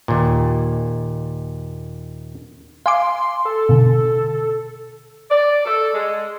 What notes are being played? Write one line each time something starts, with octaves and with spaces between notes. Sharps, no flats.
D#2 A#2
F5 G#5 C6 D6
A4
B2 D3
D5
A4
G#3